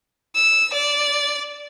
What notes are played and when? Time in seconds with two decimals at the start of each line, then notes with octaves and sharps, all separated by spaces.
0.35 E6
0.74 D5